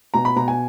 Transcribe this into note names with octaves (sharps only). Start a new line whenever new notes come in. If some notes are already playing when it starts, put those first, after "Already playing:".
B2 A#5
B5
B2 A#5
G#5